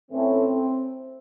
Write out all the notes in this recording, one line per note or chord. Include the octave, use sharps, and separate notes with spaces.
A2 E3 A3 C4 C#4 E4